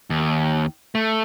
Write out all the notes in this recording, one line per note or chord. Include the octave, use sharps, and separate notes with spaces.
D#2
A3